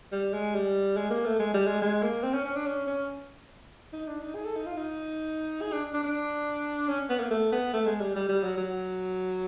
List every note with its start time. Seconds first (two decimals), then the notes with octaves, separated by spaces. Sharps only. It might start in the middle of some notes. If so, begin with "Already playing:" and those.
0.12 G3
0.34 G#3
0.55 G3
0.97 G#3
1.10 A#3
1.26 A3
1.39 G#3
1.54 G3
1.67 G#3
1.82 G#3
2.03 A#3
2.23 C4
2.34 C#4
2.45 C#4
2.56 D4
2.66 C#4
2.87 C#4
3.93 D#4
4.07 D4
4.21 D#4
4.35 G#4
4.45 A4
4.56 D#4
4.66 F4
4.77 D#4
5.62 G#4
5.72 D4
5.94 D4
6.04 D4
6.89 C#4
7.10 B3
7.20 A#3
7.31 A3
7.52 B3
7.73 A3
7.86 G#3
8.01 G3
8.16 G3
8.29 G3
8.43 F#3
8.57 F#3